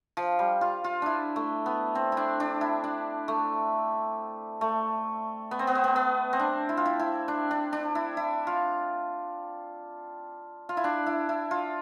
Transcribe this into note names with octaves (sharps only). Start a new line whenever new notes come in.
F3
G3
F4
F4
D4 E4
A3
B3
C4
D4 E4
D4
E4
D4
A3
A3
B3
C4
B3
C4
B3
B3
C4
D4
E4
F4
E4
E4
D4
D4
D4
E4
E4
F4
F4
E4
D4
E4
E4
F4